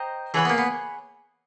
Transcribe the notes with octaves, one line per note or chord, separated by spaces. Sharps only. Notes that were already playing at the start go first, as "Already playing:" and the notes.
Already playing: C5 D#5 G5 A#5
E3 G#4 C#5 F#5 B5
B3
A#3
B3